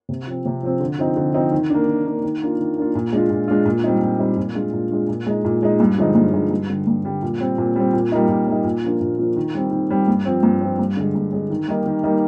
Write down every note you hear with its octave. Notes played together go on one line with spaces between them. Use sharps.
C3
F3 C4
C3
F3 C4
D3
F3 C4 D#4
D3
F3 C4 D#4
D#3
A#3 D4
D#3
A#3 D4
D#3
A#3 D4 F4
D#3
A#3 D4 F4
A#2
G#3 D4 F4
A#2
G#3 D4 F4
A#2
G3 C4 D#4
A#2
G3 C4 D#4
A#2
G#3 D4 F4
A#2
G#3 D4 F4
A#2
G#3 D#4
A#2
G#3 D#4
G2
D3 F3 G#3 D#4
G2
D3 F3 G#3 D#4
G2
D3 G3
G2
D3 G3
A#2
G3 C4
A#2
G3 C4
A#2
G3 A#3 D#4
A#2
G3 A#3 D#4
A#2
F3 A#3 D4 F4
A#2
F3 A#3 D4 F4
D#3
G3 C4
D#3
G3 C4
G2
F3 C4
G2
F3 C4
G2
D3 G#3
G2
D3 G#3
D#3
G3 A#3 D#4
D#3
G3 A#3 D#4